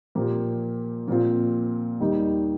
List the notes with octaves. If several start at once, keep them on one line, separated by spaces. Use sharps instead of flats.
A#2 F3 A#3 G4
A#2 F3 C4 F4
D#2 D#3 G3 D#4